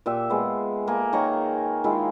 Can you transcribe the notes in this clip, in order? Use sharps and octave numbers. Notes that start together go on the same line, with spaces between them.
A#2 G4 E5
G#3 B3
A#3 G#4 A4
D#3 C#5 A#5 C6
D#3 G#3 E4 F4